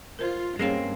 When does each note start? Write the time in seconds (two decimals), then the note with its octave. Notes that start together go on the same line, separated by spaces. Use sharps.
0.19 F4 A#4 C5
0.59 G2 G#3 A#3 C4 C#4 G#4 C#5